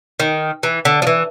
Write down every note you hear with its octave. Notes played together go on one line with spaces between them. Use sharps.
D#3
E3
D3
F3
E3